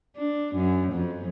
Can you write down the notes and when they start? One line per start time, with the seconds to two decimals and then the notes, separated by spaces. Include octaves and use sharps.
0.16 D4
0.55 F#2
0.93 F2